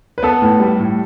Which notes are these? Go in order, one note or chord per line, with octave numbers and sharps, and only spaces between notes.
B4
B3 A4
A2
G3
A2